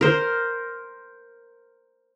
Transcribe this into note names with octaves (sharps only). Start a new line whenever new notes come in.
A#4 C5